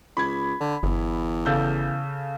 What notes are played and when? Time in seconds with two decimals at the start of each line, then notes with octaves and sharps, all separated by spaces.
0.17 C#2 B5 G#6
0.60 D3
0.83 G1 E2
1.46 C#3 A4 G6